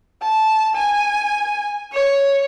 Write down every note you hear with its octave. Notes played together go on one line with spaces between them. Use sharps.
A5
G#5
C#5